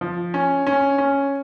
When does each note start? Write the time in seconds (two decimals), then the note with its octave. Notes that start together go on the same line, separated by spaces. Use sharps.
0.01 F3
0.34 C#4
0.67 C#4
0.98 C#4